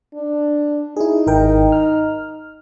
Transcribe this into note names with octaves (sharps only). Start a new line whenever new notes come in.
D4
D#4 E4 G#4
G#1 A#4 G5
F6